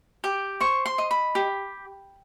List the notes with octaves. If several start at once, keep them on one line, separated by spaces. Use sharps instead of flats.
G4 D6
C5 C#6
C6
D#5
B5
G4